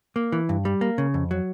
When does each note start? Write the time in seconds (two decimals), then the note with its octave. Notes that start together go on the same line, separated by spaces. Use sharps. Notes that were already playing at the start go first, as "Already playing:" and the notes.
0.16 A#3
0.32 E3
0.49 G2
0.65 G3
0.81 A#3
0.98 C#3
1.14 F2
1.31 F#3